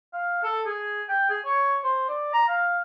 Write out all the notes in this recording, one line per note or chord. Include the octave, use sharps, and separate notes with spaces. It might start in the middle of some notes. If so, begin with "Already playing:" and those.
F5
A4
G#4
G5
G#4
C#5
C5
D5
A#5
F5